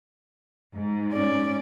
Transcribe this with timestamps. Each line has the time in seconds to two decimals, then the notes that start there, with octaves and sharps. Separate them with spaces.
0.75 G#2
1.12 C#4 D5